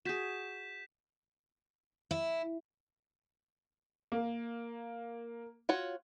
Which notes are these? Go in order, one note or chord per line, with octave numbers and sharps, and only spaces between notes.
F#4 G#4 G6 B6 E7
E4
A#3
F4 F#4 C#5